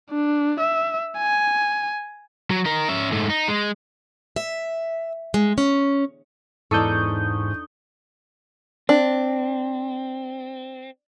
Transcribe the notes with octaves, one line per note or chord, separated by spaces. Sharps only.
D4
E5
G#5
F#3
D#4 A#4
C#4 E5
G#2 A3
D#4
G#3
E5
G#3
C#4
E2 G#2 D4 D#4 A4 C#6 D#6 G6
C4 D4